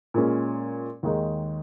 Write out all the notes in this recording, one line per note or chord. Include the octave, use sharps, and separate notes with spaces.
A#2 G#3 C#4
D#2 D#3 G#3 D#4